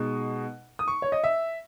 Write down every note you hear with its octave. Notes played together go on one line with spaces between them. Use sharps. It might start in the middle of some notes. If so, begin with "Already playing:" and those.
Already playing: B2 G#3 D#4
D#6
C#6
C#5
D#5
E5